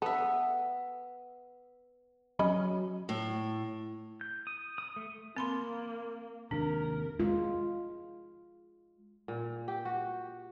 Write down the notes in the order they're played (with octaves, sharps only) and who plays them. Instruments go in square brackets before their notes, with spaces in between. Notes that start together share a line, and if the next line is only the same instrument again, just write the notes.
[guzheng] B3 E5 [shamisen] A4
[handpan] F#3 [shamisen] C#4 D#5 B5
[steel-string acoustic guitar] A2
[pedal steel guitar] G6
D#6
D#6
A3
[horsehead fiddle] A#3 [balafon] C4 B5 C6
[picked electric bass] D#2 C3 [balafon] D4 [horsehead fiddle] A#4
[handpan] G#3 F4
[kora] A#2
G4
F#4